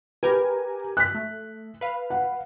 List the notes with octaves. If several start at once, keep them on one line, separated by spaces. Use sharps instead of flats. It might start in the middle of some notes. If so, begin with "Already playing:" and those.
G4 A#4 B4 G#5
F#6 B6
A3
B4 F5
F#5